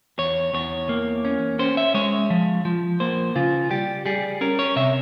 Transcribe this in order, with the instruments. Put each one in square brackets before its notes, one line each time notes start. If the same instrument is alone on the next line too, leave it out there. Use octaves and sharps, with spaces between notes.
[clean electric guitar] E2 C#5
E2 C#5
A#3
C#4
C#4 C5
E5
G#3 C#5
F3
F3
A#3 C5
C#3 F4
G3 G4
G3 G#4
C#4 A#4
C#5
C3 E5